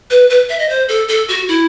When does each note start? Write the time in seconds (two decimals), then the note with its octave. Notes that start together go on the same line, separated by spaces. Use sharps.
0.10 B4
0.30 B4
0.49 E5
0.59 D#5
0.69 C5
0.88 A4
1.08 A4
1.28 F#4
1.48 E4